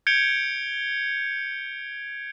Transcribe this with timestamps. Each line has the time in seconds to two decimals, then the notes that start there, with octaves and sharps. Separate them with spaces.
0.07 G6 G#6 C#7 D7 F7 G7